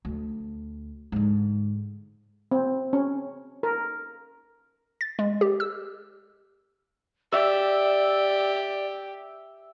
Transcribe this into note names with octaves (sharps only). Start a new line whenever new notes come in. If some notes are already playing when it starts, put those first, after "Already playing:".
D2
G#2 D3
C4
C#4
A#4
A6
G#3
G4
E6
G4 D5 E5